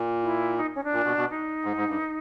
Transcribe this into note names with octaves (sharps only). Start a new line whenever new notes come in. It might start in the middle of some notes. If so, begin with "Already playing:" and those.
Already playing: A#2
E4
D#4
C#4
D4
A#2
B2
B2
D#4
G#2
G#2
G2